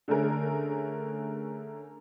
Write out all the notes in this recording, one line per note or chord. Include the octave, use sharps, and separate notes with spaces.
D3 A3 C#4 G#4 A#4